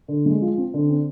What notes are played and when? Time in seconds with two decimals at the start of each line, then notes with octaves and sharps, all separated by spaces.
0.08 D3
0.26 G#3
0.42 F3
0.58 C4
0.74 D3
0.90 C4